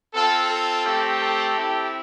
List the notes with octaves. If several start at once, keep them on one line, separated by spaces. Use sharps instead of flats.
C4 F4 A4
A4
A3 C4 G4
A4
C4 E4 G4